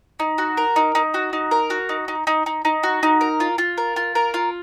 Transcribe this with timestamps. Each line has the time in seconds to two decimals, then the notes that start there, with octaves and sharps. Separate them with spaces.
0.20 D#4
0.38 F#4
0.57 A#4
0.76 D#4
0.95 D#4
1.14 F#4
1.33 D#4
1.51 A#4
1.70 F#4
1.89 D#4
2.08 D#4
2.27 D#4
2.46 D#4
2.65 D#4
2.83 F#4
3.03 D#4
3.21 A#4
3.40 F4
3.58 F4
3.78 A#4
3.96 F4
4.15 A#4
4.34 F4